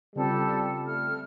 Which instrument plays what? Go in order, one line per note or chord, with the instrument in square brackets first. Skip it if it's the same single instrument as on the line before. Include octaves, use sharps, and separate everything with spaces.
[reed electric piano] C#3 C4 F4 [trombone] G3 [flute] A4
[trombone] A3 [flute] F6